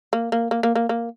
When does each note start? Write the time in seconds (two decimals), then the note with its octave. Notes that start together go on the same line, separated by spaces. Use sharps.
0.13 A#3
0.32 A#3
0.51 A#3
0.63 A#3
0.75 A#3
0.89 A#3